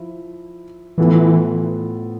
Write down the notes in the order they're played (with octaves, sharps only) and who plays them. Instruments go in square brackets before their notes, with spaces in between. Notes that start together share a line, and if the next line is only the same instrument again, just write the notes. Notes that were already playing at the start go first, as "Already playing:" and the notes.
Already playing: [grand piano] F3 E4
[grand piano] A2 F3 B3 F4 A4 [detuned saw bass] E3